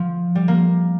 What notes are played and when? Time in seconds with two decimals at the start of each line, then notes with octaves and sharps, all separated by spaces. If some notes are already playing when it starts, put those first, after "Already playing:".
Already playing: F3
0.35 G3
0.48 A#3